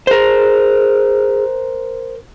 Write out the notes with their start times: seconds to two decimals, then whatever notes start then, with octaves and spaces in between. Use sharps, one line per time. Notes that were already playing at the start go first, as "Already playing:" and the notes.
0.07 G#4 A#4 C5